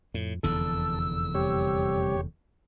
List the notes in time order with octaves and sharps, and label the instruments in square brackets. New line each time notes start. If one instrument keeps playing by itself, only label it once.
[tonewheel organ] F2 [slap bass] A2
[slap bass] F1 E2 D3 [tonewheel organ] A4 [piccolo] E6
[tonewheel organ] C3 G3 [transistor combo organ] G4 C#5